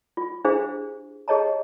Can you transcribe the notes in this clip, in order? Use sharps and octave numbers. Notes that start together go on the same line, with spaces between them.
F4
D4 E4 G4 G#4 C5 F5
G4 G#4 C#5 D#5 A5 A#5